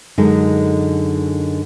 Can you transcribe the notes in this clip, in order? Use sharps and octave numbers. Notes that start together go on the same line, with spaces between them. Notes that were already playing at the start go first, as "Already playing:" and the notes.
F#2 D3 G#3 D#4